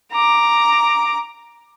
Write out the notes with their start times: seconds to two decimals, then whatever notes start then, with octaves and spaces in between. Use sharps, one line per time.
0.13 A#5 D6